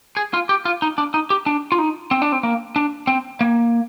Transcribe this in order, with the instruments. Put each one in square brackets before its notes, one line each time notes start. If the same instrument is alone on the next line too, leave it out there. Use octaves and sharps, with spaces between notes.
[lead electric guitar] G#4
F4
G4
F4
D#4
D4
D#4
G4
D4
F4
D#4
C4
D4
C4
A#3
D4
C4
A#3